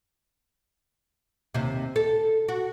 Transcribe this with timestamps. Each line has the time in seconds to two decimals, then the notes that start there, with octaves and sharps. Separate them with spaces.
1.54 D#2 C3
1.96 A4
2.48 F#4